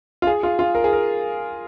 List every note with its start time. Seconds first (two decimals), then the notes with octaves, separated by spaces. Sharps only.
0.22 F4
0.27 G#4
0.43 F4
0.59 F4
0.75 A#4
0.84 G#4
0.93 A#4